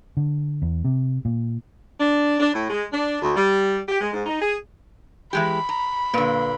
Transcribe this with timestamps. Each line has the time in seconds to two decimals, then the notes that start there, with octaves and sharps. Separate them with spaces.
0.17 D3
0.62 E2
0.85 C3
1.25 A#2
2.00 D4
2.40 D4
2.53 A2
2.70 G#3
2.92 D4
3.21 D2
3.36 G3
3.88 G4
4.01 G#3
4.13 G#2
4.26 D#4
4.41 G#4
5.33 E3 G#3 G4 B5
5.69 A#5
6.14 A#2 D3 A#3 B4